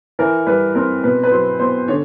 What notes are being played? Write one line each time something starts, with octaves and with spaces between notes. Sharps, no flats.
E3 A#4
G3 B4
C4 A#4
B2 B4
B4
F#3 C5
B3 C5
D3 C#5